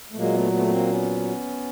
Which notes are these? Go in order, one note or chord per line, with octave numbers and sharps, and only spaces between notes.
A3
A#2 F#3 G#3 A#3
A3 B3
A3 B3
B3
A#3 C4
B3 C#4